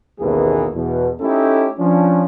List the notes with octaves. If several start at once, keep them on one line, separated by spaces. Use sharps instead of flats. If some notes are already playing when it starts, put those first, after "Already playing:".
A1 D#2 B2 E3 A#3 G#4
E2 B2
A3 C#4 D#4 E4 G4 A4
F3 C#4 D4